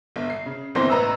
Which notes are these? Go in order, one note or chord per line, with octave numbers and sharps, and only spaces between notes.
G1
C7
C#3
G1 E3 A#3 C4 C6 A#6
A1 B4 A#5 E6